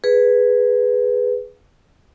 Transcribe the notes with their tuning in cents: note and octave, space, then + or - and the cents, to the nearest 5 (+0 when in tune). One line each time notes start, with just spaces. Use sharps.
G#4 +0 B4 +0